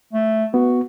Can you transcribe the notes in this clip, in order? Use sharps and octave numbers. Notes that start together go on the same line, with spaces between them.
A3
B3 F#4